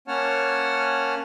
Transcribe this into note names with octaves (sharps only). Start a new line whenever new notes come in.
A#3 C#4 C#5 F#5 A5 F6